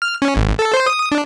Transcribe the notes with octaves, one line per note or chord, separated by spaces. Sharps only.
F6
C#4
G#1
A4
C5
D#6
D4